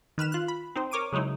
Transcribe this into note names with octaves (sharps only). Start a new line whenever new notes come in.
D#3 B4 F6 E7
F4 F#6
B5
C4 D#4 C5
A#4 C#5 D6 D7 D#7
C#3 F#3 G#3 D#4 E4